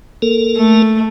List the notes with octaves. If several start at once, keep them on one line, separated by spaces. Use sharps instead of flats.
A#3 A4 A#4
A3